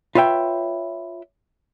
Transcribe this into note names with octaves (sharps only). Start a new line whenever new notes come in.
F4 B4 C#5 E5 G5